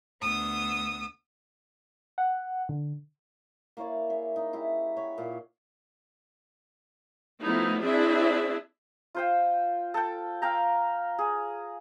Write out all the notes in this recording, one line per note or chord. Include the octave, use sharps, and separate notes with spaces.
D2 B3 D#6 E6
F#5
D3
A#3 E4 C#5 D5
G#4 E5
D#4
E4 G4 G#4
C#5 F#5 B5
A#2
F3 A3 B3 D#4 E4
C4 D4 E4 G#4 E5
F4 C5 G5
A4 G5
F5 G5 A#5
G#4